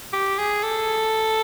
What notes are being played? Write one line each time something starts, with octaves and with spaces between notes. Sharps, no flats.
G4
G#4
A4